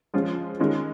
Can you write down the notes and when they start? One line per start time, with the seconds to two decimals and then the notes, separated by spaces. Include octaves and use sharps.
0.14 F3 G#3 C#4 F4
0.60 D#3 G#3 C#4 F4